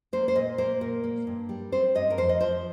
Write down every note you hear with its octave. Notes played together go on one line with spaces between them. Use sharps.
A#3 C5
C5
A#2 D#5
A#3 C5
A#2 A#4
A#3
G2
G3
C4 C5
G2 D#5
A#4
F2 C5
D#5
F3 C5